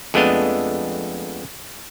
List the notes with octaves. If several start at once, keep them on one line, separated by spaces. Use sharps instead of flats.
F2 G#3 A3 B3 D4 D#5